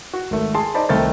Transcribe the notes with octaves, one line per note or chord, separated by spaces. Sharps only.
F#4
G#1 A3
G#4 A5 C6
D#4 C5 D5 A5 B5
C2 D#3 A3 C4 A#4 A6